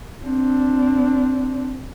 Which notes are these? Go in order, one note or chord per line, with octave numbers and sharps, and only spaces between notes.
C4 D4